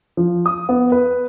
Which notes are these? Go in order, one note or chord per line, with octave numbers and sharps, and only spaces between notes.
F3
D#6
B3
B4